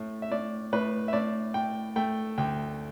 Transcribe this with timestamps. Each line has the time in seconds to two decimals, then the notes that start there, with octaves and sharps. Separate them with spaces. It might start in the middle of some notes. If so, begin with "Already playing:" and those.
Already playing: A2 A3
0.22 E5
0.31 A2 D5
0.73 A2 B4
1.08 E5
1.13 A2 D5
1.54 A2 G5
1.96 A3 G5
2.38 D2 G5